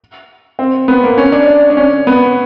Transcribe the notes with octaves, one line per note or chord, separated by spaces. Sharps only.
C4
B3
A#3
C#4
D4
D4
D4
C#4
B3